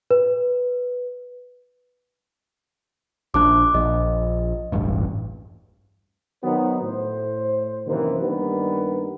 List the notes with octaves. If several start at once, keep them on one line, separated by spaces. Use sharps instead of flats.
B4
A#1 D4 D6 F#6
A#1 D#5
E1 A1 G2
D#3 F#3 B3 D#4 B4 C5
A2 C5
F#2 C3 D#3 E3 A#3 C5
G2 D#3 G3 A#3 B3 B4